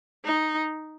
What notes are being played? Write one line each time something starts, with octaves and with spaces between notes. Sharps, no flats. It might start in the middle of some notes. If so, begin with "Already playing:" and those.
D#4